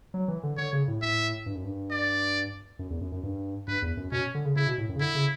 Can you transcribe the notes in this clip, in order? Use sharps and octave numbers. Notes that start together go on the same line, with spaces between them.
F#3
E3
D3
D3 C#5
C#3
A2
A2 E5
G2
F#2
G2
D5
F#2
E2
F#2
F#2
G2
G2 B4
E2
F#2
B2 C#4
D3
C#3
C#3 E4
B2
A2
F#2
C#3
D3 E4
C#3